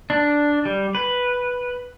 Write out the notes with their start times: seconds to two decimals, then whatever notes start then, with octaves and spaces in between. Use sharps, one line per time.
0.10 D4
0.65 G3
0.95 B4